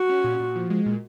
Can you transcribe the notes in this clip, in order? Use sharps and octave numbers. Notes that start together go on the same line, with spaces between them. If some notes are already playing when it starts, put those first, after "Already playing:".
Already playing: F#4
C#4
A#2
A#2
F3
G#3
A#2